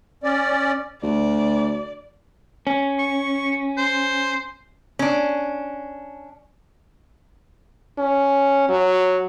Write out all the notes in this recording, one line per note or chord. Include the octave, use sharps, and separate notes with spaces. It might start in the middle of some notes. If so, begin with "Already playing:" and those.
C#4 D5
D2 D5
C#4
C#6
C5
C#4 D4
C#4
F#3